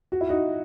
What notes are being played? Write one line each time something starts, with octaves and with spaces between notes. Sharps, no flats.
F#4
E4
D#4 F#4